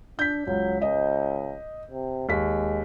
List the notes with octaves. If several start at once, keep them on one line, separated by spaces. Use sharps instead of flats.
D4 G6 B6
C#2 F#3
C#2 D#5
C3
D#2 G#3 B6